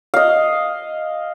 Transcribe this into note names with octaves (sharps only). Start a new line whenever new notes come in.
D#5 F5